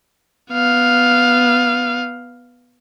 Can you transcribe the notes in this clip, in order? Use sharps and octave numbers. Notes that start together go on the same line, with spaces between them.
B3 F5